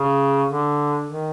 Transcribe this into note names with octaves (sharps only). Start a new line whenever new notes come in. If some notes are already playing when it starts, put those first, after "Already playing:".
Already playing: C#3
D3
D#3